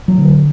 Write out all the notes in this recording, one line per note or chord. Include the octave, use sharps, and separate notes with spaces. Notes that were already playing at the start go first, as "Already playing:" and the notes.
F#3
D3